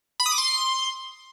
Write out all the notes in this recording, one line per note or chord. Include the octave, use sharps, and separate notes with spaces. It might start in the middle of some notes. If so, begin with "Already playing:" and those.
B5
D#6
D6
C6